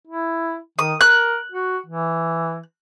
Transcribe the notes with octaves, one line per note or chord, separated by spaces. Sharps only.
E4
D#3 D#6
A#4 F#6
F#4
E3